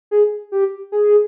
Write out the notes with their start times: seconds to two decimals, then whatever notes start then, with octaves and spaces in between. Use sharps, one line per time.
0.11 G#4
0.52 G4
0.92 G#4